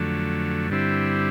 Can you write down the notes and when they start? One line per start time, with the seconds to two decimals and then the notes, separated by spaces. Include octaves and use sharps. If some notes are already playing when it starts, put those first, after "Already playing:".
Already playing: F2 D3 F#3 A3
0.70 G2 D3 G3 C4 E4